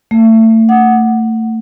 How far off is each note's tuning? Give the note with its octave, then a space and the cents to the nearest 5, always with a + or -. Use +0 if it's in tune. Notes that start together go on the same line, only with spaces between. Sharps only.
A3 +30
F#5 +0